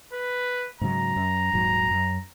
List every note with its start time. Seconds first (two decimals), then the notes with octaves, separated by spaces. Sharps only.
0.13 B4
0.81 G#2 C#3 F#3 A#5
1.16 F#2
1.53 D#1 G#2 F#3
1.90 F#2